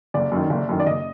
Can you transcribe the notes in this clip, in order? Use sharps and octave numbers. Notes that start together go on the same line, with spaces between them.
F#1 D5
F#2 D#3
F#1
F#2 D#3
D5
F#1 D#5